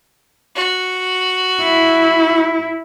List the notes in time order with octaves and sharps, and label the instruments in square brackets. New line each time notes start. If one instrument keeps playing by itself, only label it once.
[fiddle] F#4
[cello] E4